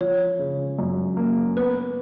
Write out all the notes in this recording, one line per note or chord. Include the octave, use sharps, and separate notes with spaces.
F3 C#5
C#3
F#2
A#3
B3 B4